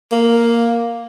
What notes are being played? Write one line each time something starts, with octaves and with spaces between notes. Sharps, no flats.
A#3